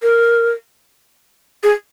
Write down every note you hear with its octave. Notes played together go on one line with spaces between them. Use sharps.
A#4
G#4